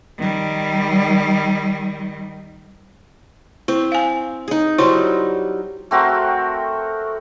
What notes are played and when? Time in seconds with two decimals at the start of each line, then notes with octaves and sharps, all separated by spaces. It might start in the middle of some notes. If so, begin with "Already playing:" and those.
0.19 D#3 G3
3.68 C4 E4
3.92 F5 G#5
4.48 D#4 G#4
4.78 F#3 G3 D#4 E4 C5 C6
5.91 A3 C4 F#4 A#4